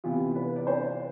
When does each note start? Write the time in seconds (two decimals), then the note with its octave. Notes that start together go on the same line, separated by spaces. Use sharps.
0.04 C3 E3 B3 F4 G4
0.36 B4
0.56 D5
0.67 C5